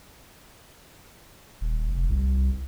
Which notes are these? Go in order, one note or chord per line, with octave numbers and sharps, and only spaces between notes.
D#1
F1
C2